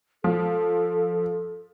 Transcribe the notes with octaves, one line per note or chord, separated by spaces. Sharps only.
F3 A4